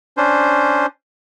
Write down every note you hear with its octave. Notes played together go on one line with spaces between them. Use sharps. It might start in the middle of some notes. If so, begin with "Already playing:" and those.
C#4 D4 C5